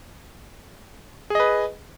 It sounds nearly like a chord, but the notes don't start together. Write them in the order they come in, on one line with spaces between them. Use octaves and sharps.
G#4 D#5 B4